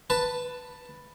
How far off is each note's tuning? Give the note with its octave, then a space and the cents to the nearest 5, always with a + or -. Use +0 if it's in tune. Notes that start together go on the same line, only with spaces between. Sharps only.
B4 +0 A5 +10